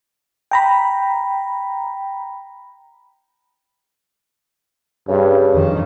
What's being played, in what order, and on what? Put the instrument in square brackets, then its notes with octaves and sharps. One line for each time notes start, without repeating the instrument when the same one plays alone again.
[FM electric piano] G5 A#5 B5
[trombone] G2 [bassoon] C#3
[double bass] F2 D#3